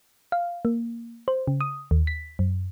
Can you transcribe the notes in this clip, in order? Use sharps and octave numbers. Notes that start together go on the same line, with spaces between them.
F5
A#3
C5
C#3
D#6
D#2
B6
F#2